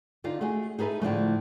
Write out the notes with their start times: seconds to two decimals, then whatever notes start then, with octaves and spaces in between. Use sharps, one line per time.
0.24 D3 D#4 F4
0.41 A3 F#4 G#4
0.79 D#4 G#4 A4 B4 E5
1.02 A2 D3 F3 A3